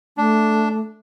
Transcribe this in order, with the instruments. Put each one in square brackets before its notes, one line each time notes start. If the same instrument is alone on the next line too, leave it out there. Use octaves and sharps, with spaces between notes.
[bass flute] A3 [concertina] D4